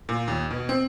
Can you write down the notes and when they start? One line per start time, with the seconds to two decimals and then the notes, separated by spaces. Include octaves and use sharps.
0.09 A#2
0.28 D#2
0.50 B2
0.69 C4